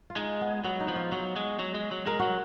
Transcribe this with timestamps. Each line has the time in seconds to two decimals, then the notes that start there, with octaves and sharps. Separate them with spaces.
0.10 F4
0.17 G#3 D#4
0.41 B3
0.64 F#3 B3
0.80 D#4
0.88 F3
0.96 F4
1.12 F#3 F#4
1.36 G#3
1.59 F#3
1.74 G#3
1.91 F#3
2.06 G#3 A#4
2.19 F#3 F#4